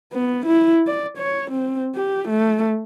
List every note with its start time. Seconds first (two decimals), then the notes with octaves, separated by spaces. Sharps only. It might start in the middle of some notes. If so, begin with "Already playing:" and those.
0.13 B3
0.46 E4
0.87 D5
1.18 C#5
1.51 C4
1.95 G4
2.29 A3